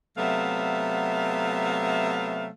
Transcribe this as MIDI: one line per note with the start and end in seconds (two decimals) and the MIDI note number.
0.18 2.49 48
0.18 2.49 54
0.18 2.49 57
0.18 2.49 59
0.18 2.49 76
0.18 2.49 77